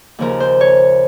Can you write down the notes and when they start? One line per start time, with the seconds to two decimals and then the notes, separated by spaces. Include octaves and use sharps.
0.18 D#2 C#3 F3 A#4
0.40 C5
0.61 C#5